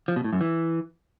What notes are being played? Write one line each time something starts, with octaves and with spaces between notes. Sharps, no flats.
F3
B2
A2
F#2
E3